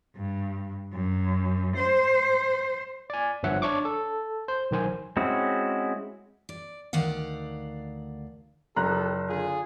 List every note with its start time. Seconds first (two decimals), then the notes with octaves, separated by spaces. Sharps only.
0.16 G2
0.93 F#2
1.76 C5
3.10 D5 G#5
3.43 G1 G2 F3 C#5 E5 F#5
3.62 D4 C#5 C#6 D6
3.85 A4
4.48 C5
4.71 B1 D#3 C5 G#5
5.17 G#3 C4 C#4 E4 F#4
6.49 D5
6.93 D2 D#3 D5 F5 F#5
8.76 F#1 F3 G4 A4 A#5 F#6
9.29 D3 F4 G#4